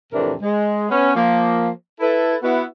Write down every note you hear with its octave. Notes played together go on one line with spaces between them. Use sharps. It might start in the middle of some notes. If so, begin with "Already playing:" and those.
F2 A2 C3 E3 D4 A#4
G#3
B3 C#4
F3 A#3
E4 A4 B4
B3 E4 F#4